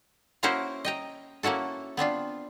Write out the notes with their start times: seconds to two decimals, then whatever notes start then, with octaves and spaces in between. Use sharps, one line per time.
0.43 A#3 C#4 E4 F#4 A#4 C5
0.85 D#5 G5 A#5
1.43 A#3 C#4 E4 F#4 A4
1.97 B3 C4 D4 F4